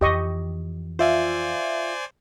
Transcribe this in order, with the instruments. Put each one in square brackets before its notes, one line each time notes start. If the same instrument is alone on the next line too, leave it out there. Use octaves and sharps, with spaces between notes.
[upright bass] F2 E3 [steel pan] G4 D#5 C#6
[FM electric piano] F4 E5 F5 [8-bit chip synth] C5 D5 G#5